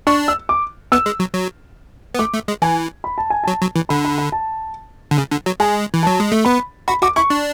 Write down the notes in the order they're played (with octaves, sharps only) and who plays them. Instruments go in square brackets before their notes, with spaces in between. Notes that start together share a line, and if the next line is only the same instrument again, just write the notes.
[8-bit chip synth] D4 [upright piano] C#6
[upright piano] E6
D6
[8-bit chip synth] B3 [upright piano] E6
[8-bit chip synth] G#3
F#3
F#3
B3
[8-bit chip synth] A3 [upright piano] D6
[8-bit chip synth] A3
G#3
[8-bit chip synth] E3 [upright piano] G#5
[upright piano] B5
A5
G#5
[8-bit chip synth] F#3 [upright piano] A5
[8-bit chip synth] F#3
E3
[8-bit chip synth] D3 [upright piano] B5
[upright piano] B5
B5
A5
[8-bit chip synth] D3
C#3
D3
F#3
[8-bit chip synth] G#3 [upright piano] G#5
[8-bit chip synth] E3
[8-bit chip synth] F#3 [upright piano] A5
[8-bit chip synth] G#3
A3
[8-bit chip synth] B3 [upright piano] B5
[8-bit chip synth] F#4 [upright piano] B5
[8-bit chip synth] F#4 [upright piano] D6
[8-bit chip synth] E4 [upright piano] C#6
[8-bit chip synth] D4